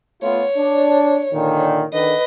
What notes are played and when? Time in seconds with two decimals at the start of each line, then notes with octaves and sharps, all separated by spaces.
0.23 A3 B3 F4 C#5
0.57 D4
1.34 A#2 D3 D#3
1.93 D3 D#3 B4 D#5